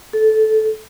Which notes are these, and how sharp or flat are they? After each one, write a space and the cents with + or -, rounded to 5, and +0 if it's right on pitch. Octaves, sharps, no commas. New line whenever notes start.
A4 -15